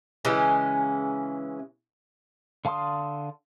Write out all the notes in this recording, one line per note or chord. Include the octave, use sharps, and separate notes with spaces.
C#3 E3 G#3 C#4
D3 F5 A5 C6 D#6